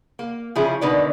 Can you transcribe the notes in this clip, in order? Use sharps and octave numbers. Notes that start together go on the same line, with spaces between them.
A#3
C#3 F3 C#4 E4 G#4
B2 D3 D#3 B4 D5